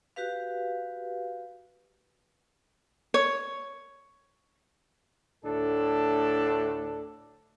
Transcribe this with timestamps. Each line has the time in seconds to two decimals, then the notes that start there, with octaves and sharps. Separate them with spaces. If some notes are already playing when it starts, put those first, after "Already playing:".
0.16 F#4 G4 B4 F5
3.14 C#5
5.44 D2 A2 D4 A4